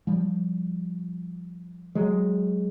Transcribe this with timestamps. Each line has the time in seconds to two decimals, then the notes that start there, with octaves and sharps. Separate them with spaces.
0.07 F3 G3
1.95 F#3 G#3